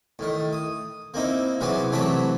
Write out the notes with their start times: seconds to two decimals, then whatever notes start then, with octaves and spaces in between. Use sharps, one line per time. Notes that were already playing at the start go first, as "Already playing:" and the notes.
0.19 A2 D#3
0.53 D#6
1.14 A#3 C4 D#4 E4
1.61 C3 E3 F#3 B3 G#4
1.92 C3 E3 F#3 A3 A5 B5